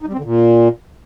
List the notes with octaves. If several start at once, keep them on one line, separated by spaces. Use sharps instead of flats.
D#4
G3
C4
D3
A#2